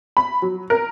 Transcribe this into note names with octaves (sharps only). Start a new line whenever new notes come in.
B5
F#3
A#4